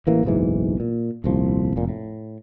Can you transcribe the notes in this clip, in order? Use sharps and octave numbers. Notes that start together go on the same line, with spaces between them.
A1 E3 A#3
F#1 B1 G#2 E3
A#2
D#1 C2 F3
F1 A#2
A2